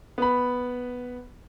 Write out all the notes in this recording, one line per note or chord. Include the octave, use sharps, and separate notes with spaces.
B3 B5